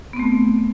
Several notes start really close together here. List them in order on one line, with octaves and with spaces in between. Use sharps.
B3 C4 A3